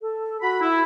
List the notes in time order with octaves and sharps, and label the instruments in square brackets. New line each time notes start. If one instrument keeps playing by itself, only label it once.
[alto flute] A4
[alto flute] F#4 [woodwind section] B5
[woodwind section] E4